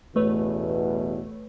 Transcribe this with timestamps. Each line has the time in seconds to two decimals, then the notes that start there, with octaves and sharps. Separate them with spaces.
0.16 A1 E2 B2 A3 B4 C#5